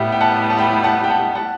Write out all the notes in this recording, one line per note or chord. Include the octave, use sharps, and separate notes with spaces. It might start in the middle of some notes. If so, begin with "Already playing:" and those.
Already playing: A2 G3 B3 E5 G5
G5
F#5 A5
A5
G5 B5
G5
F#5 A5
G5
F#5 A5
F#5 A5